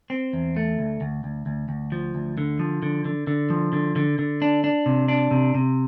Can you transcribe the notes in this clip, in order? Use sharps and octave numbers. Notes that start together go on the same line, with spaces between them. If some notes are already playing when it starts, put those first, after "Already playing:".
C4
E2
A3
D2
D2
D2
D2
D2
F3
D2
D3
F3
D3
D3
D3
F3
D3
D3
D3
D4
D4
C3
D4
C3
C3